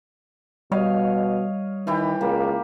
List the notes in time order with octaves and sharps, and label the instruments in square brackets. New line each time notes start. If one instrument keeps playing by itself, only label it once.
[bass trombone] B2 [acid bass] G3 [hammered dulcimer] C#5 D#5 F5
[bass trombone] D#3 [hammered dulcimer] E3 E4 G4
[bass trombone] C#2 [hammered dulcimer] A#3